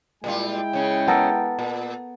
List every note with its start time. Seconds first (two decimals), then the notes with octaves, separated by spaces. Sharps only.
0.24 A#2 G3 G#3 E4 F4 G5
0.73 C#3 C#4
1.07 B3 A4 A#4
1.59 A#2